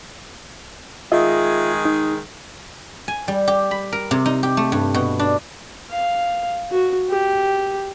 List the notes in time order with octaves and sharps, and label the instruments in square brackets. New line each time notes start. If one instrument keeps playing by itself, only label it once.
[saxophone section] D#3 G#3 G#4 [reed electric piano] F4 D#5 E5
[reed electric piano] D#4
[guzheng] G#5
G3
G4
B5
A#4
C3
D#4
G4
A3
G2
B2
D4
[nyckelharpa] F5
F#4
G4